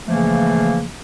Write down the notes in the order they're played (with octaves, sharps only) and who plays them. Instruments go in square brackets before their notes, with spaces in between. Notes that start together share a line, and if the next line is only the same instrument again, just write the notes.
[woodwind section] C#3 E3 F3 A3 A#3